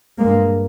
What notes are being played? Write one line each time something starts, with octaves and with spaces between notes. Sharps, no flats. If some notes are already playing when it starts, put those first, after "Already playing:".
G2 G#3 A#3